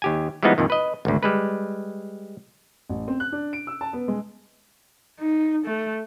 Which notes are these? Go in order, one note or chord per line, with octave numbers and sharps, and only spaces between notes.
D#2 G4 G#5
E3 F3 G3 G#3 B3 D#4
F2 A#2 D#3
B4 D#5
G#1 D2
G3 G#3 B4
A1
C4
F#6
D4
D7
E6
A5
B3
G#3
D#4
A3